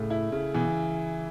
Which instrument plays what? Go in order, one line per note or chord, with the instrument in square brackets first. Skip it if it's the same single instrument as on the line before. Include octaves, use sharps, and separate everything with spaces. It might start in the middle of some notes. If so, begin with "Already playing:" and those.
Already playing: [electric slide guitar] A2 [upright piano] C#3 A3
[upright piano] E4
C#3
[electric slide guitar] B2 [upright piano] E3